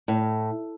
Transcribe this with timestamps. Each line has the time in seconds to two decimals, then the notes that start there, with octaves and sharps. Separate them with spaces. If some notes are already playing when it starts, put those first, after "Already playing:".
0.08 A2